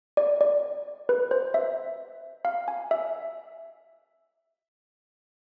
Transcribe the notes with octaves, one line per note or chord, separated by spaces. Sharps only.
D5
D5
B4
C5
E5
F5
G#5
E5